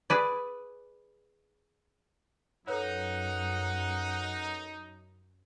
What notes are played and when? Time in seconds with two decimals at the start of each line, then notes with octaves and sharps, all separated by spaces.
0.10 G#4 B4 D5
2.68 F#2 D#4 A4 B4 C#5 F#5